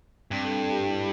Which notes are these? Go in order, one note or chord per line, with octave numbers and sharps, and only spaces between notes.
G2 C4
A4
A4
G4
E4